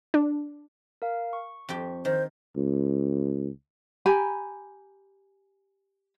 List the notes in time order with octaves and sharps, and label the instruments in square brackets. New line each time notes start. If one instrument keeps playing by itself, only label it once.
[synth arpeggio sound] D4
[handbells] A#4 F5
C#6
[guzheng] F2 G4 G5
[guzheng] D#3 [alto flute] C5
[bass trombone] C#2
[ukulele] G4 G#5 A#5 B5